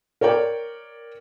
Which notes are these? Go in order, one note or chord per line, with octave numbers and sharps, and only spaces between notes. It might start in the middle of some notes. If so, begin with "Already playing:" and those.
A#4 C#5 D5 G5